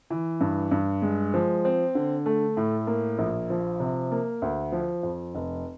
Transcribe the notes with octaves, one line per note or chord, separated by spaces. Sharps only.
E3
G2
G2
G#3
F3
C4
D3
A3
A2
A#3
A#1
F3
C3
A#3
D2
F3
F2
F1